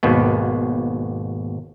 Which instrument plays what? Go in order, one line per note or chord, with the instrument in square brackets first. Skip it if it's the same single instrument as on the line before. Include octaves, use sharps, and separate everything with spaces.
[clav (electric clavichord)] G#1 D#2 B2 B3